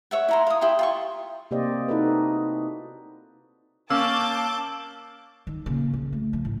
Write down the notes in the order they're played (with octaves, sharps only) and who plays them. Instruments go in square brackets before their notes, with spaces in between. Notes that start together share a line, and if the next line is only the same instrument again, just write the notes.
[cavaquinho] C#5 E5 F#5
E4 A#5 C6
F5 D#6
E4 G4 G5 C6
F4 C6 C#6
[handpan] C3 A#3 G4 C5 D5 D#5
D#4 E4 F#4 A4 B4
[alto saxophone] A#3 [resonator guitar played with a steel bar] C#4 [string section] A5 D6 G6 [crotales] E6
[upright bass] D#3
A#2 C#3
C#3
A3
F3
A2